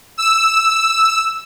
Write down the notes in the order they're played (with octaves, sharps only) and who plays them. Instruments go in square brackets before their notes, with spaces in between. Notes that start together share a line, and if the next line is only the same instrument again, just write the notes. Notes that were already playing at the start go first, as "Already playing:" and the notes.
[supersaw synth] E6